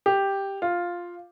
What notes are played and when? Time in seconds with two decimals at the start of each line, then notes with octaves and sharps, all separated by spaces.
0.06 G4
0.62 F4